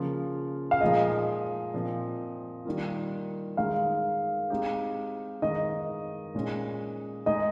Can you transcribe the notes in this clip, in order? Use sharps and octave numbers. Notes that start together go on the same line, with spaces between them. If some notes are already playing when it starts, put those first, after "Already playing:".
Already playing: C#3 F3 A#3 F4
F5
A#2 F3 G#3 D#4 G#4 D#5
A#2 F3 C4
D#3 G3 A#3 F4
D#3 G#3 D#4 F5
G#3 C4 D#4 G4
D#3 G#3 D#4 G#4 D#5
A#2 G#3 C#4
G#3 D#4 G#4 D#5